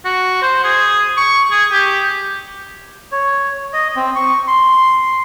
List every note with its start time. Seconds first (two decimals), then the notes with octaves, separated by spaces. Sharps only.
0.05 F#4
0.42 C5
0.64 G#4
1.17 C#6
1.51 G#4
1.72 G4
3.12 C#5
3.73 D#5
3.96 C4
4.15 C#6
4.48 C6